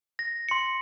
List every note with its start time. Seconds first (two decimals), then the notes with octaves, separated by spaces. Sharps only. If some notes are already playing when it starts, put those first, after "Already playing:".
0.19 A#6
0.49 C6 C#7